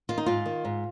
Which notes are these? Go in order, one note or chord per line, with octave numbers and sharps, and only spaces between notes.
D#3 F4
D#4
G#2 F4
D#3
G#2